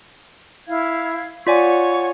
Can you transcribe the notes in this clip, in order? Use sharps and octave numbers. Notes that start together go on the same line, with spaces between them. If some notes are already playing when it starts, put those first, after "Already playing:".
E4 F5 G#6
F4 C#5 D5 F#5 G#5 C#6